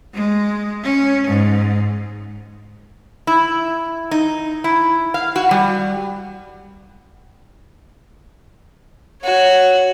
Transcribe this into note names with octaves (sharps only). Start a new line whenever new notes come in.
G#3
C#4
G#2
E4
D#4
E4
F5
F#4
G3
F#4 C#5